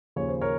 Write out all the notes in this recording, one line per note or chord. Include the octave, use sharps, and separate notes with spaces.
D#2 C#3 F3 C#5
C5
A#4 C#5